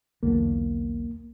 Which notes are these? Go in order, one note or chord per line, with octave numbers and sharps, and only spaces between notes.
B1 E2 D3 A#3